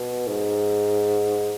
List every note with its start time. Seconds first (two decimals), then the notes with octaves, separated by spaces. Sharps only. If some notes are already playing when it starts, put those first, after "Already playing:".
Already playing: B2
0.27 G#2